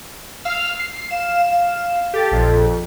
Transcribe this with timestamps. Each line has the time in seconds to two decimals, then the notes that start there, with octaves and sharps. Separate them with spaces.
0.45 F5 E6 F6
0.79 C7
1.11 F5 E7
1.51 F5
2.14 G4 A4 A6
2.31 A#1 F2